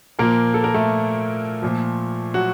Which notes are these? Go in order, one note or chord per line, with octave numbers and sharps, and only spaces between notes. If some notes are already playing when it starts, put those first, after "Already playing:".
A#2 F3 A#3 A#4
A4
A#4
A3 A4
A#2 F3
F#3 F#4